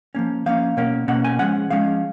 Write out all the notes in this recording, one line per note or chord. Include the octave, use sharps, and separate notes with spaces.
F3 A#3 C#4
F3 A#3 C#4 F5
B2 A#3 C#4
B2 A#3 C#4 F#5
G#5
F3 G#3 C#4 F#5
F3 G#3 C#4 F5